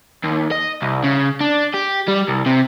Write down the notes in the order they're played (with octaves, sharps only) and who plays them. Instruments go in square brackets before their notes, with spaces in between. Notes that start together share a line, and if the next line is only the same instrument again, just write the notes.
[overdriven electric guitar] D#2
D#5
C2
C#3
D4
G4
G3
C2
C3